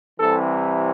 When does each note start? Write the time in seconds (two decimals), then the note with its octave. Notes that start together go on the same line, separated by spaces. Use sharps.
0.20 C2 C3 E3 A4